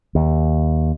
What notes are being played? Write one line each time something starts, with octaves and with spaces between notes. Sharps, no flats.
D#2